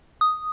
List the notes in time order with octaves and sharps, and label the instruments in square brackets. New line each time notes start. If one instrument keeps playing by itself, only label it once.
[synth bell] D#6